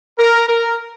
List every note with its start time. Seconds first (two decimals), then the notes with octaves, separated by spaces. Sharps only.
0.18 A#4
0.48 A#4